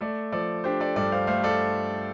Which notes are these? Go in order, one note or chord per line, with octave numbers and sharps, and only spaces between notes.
A3 A4 D5
F3 A4 D5
D4 G4 C5
A4 D5
G2 A4 D5
C5 F5
A3 C5 F5
A4 D5